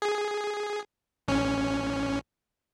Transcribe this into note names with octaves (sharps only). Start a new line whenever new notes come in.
G#4
A1 C#4